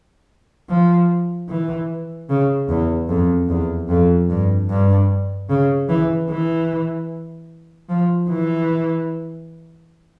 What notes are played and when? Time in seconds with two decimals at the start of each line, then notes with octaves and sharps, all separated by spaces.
0.69 F3
1.49 E3
2.29 C#3
2.69 E2
3.09 F2
3.49 E2
3.89 F2
4.29 G2
4.70 G2
5.49 C#3
5.89 E3
6.29 E3
7.89 F3
8.29 E3